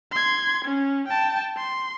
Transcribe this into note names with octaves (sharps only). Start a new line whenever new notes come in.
C6 G#6
C#4
G5 A5
C6